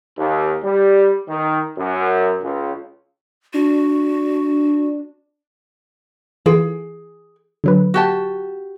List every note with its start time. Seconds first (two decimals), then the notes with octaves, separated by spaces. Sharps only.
0.17 D#2
0.64 G3
1.28 D#3
1.78 F#2
2.41 C#2
3.54 D4 F#4
6.46 E3 F4 G#4 D7
7.64 D3 F#3 B4
7.94 F#4 G4 A5